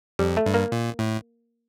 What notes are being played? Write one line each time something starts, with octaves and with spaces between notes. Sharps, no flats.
F2 G3
A3
G2
A#3
A#2
A2